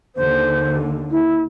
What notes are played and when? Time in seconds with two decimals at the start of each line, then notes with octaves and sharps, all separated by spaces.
0.15 D#2 D3 C5
1.10 E4